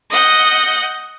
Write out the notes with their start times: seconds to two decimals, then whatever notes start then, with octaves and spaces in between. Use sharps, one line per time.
0.10 D#5 F#5 G6